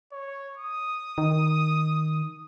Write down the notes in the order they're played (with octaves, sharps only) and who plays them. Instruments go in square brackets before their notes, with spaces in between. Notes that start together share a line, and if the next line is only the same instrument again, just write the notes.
[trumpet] C#5
D#6
[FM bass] D#3